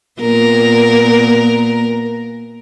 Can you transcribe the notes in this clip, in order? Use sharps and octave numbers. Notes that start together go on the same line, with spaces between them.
A#2 B3 A#4